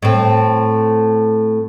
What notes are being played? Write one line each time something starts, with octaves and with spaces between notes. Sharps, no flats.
A2 C4